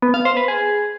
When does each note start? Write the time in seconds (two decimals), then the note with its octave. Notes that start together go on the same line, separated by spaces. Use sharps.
0.02 B3
0.14 F5
0.25 C5
0.37 B4
0.48 G#4